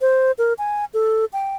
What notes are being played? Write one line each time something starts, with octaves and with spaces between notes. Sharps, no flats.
C5
A#4
G#5
A4
G5